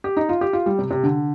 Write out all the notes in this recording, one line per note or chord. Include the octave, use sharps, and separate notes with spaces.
G4
D#4
F4
G4
F4
G3
C3
C3
D3